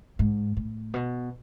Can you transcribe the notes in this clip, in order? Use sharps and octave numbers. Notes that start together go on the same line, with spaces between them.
G#2
A2
B2